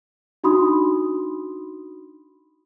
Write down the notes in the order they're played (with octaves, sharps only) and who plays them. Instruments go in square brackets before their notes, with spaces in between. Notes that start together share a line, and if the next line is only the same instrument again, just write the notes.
[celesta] D4 D#4 F#4 B5 C6 D#6